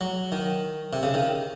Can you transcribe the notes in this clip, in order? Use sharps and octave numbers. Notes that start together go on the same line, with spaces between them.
F#3
D#3
C3
C#3
D#3